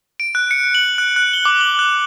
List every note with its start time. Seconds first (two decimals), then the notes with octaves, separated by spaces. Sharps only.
0.20 D7
0.35 F#6
0.51 C#7
0.75 F#7
0.98 F#6
1.16 F#6
1.33 G7
1.45 D6
1.61 F#7
1.79 F#6